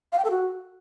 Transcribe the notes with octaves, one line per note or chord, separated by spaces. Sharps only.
F5
G5
A4
F#4